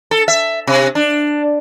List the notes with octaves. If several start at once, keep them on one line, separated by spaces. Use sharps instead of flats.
A4
E5
C3
D4